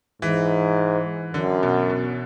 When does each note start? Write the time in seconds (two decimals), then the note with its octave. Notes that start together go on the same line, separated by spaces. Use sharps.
0.22 G#2 E3
1.34 F#2 D3
1.63 B2
1.90 B2